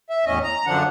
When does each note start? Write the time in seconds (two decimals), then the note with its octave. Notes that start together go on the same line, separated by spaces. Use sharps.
0.10 E5
0.25 E2 A2 C#4 D#5
0.43 A#5
0.66 F#2 D3 F3 D4 F#5